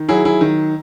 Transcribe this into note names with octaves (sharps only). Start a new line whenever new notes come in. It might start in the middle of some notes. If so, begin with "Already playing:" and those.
Already playing: D#3
F#3 E4 G#4
E4 G#4
D#3